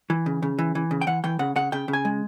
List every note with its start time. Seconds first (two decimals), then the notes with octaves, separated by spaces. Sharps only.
0.10 E3
0.26 C#3
0.42 C#3
0.58 E3
0.75 E3
0.91 C#3
1.01 G5
1.07 E3 F#5
1.24 E3 G5
1.39 C#3 F#5
1.56 C#3 F#5
1.72 C#3 G5
1.88 C#3
1.93 G#5
2.05 G#3